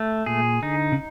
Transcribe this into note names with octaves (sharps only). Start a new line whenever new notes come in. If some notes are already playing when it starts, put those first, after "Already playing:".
Already playing: A3
A#2 G#4
D3 D#4
C#3